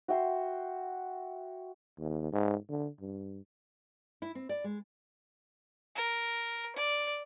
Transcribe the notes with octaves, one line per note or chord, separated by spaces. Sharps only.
F#4 E5 G5 C6
D#2
G#2
D3
G2
E4
C4
D5
G#3
A#4
D5